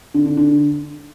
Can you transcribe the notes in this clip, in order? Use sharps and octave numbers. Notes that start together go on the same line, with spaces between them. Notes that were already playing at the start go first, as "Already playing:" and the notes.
D3
D3
D3